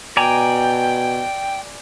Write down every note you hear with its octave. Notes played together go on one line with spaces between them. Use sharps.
B2 D5 G5 G#5 A#5